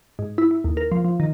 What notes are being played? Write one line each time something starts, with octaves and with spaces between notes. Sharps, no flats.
G#2
E4
E4
D#2
A#4
F3
F3
D#3